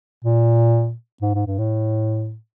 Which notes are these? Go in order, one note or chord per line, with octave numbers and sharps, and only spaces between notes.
A#2
G#2
G#2
G2
A2